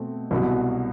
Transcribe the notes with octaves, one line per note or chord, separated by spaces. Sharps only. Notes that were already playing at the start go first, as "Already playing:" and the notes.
Already playing: B2 A3 C4
C2 B2 F#3